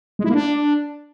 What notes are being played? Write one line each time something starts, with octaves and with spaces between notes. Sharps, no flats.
G#3
E4
A#3
D4